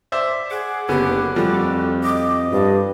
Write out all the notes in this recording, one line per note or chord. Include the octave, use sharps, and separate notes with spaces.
C5 D5 E5
G#4 F#5 D6
F#1 D3 B3 C#4 G4
F2 F3 G3 A3 F#4
D#5 D6
G2 D5